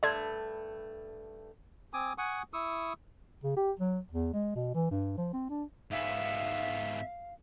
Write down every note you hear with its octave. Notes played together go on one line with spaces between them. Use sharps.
G2 A3 D5 C6 G#6
C4 G#5 D6 D#6
F#5 G#5 C#6 D#6
E4 C#6 D#6 E6
C#3
G4
F#3
E2
G#3
B2
E3
G2
F3
C4
D4
G#2 B3 E5 F5